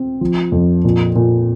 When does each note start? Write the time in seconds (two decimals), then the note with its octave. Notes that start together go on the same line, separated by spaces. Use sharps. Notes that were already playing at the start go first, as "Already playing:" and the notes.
Already playing: C4
0.21 F3
0.52 F2
0.85 A#2
1.16 A#2